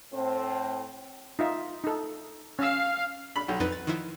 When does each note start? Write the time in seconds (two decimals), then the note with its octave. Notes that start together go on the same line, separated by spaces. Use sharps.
0.13 A2 C4
1.39 D#4 F4 E5
1.84 D#4 A4
2.59 C#4 F5 E6
3.36 B5
3.48 B1
3.60 F2 D#4 B4 A6
3.72 A6
3.87 D#3 F3 E4